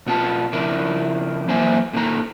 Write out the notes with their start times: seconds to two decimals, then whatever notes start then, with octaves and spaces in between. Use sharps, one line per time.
0.06 B2 B3 F4 A5
0.53 C#3 F3 D4 E4 A#4
1.48 F#2 E3 A#3 C5 E5 G#5
1.93 A#2 D3 D#3 A#5